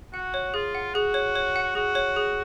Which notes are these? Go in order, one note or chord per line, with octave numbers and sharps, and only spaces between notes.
F#4 F#5
C#5
F4 G#4
F#5
F#4 G#4
C#5
C#5
F#5
F#4 G#4
C#5
G#4